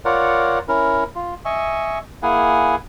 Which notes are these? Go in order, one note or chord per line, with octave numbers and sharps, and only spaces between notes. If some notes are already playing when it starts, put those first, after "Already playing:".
F4 A#4 C#5 D5 F#5
C#4 E4 A#4
F4
D#5 E5 G#5 C#6
A#3 E4 G#4 F#5 G#5